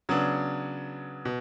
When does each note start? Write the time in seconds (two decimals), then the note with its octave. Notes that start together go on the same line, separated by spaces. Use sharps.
0.09 C#3 F#3 B3 D4
1.25 B2